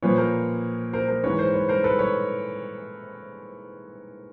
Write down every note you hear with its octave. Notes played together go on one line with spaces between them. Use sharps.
A#2 F3 B4 C#5
A#4 C5
A#4 C5
A#4 C5
G#2 E3 B4 C#5
B4
A#4 C5
B4 C#5
A#4 C5
A4 B4
B4 C#5